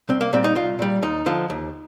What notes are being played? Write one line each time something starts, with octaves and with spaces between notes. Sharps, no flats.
C2 C4
A#3
A#2 G3 C4
D#4
C2 F4
A#2 G3
D#2 D#4
D3 F3
D#2